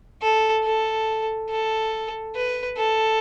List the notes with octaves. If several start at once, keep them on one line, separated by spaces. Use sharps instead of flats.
A4
A4
A4
B4
A4